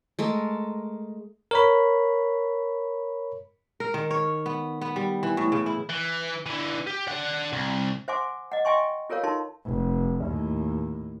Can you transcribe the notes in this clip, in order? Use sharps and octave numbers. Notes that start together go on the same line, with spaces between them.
G#3 A3 A#4
A#4 C#5 B5
A#4
D#3
C#5
B3
B3
G3
E3
A2
C#3
E4
E3
D3 E3
G4
D4 F#5
C2
C5 E5 F#5 G#5 C6 D6
D#5 F#5
D#5 E5 G5 G#5 C6 C#6
F4 A4 A#4 C#5 F5
D#4 F4 A#4 A5 C6
F1
D#2 A2